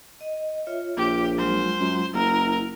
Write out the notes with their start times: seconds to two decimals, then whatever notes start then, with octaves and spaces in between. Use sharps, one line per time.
0.21 D#5
0.66 F4 C#5 E5
0.97 A#1 G4
1.38 F#3 G#3 F4 C5
1.80 F#2
2.14 F#1 E4 A#4